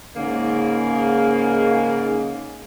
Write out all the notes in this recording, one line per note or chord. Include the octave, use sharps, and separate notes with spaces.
G#2 C#3 A#3